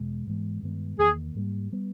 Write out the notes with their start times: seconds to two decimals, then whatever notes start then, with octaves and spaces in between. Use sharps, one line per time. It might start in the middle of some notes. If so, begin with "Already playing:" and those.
Already playing: E2 B2 G#3
0.27 G#2 E3 G#3 B3
0.62 G2 D#3 G#3 B3
0.98 E2 D#3 A#3 G#4
1.35 G#2 G3 A#3
1.73 G3 B3